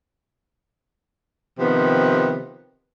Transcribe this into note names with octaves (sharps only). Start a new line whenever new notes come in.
C3 D#3 F3 B3